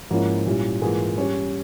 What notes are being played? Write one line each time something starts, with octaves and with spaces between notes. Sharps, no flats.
G#2 F3 A#3 C#4 E4
A#2 G3 C#4 E4
G#2 E3 A#3 F4 G#4
G3 C#4 G4 C#5